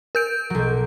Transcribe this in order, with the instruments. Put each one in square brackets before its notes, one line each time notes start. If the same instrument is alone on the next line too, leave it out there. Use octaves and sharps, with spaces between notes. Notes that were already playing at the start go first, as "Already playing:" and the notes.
[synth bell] A#4 G6 D7
[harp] B1 F#3